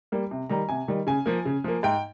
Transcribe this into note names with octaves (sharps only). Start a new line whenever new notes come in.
G3 A#3
C3
D#3 G3 A#5
C3 G#5
D#3 G3
C#3 G#5
F3 A#3
C#3
F3 A#3
G#2 G5